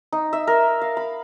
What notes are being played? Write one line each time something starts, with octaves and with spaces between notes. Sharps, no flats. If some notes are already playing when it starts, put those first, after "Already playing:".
D#4
E5
A#4
F5
B5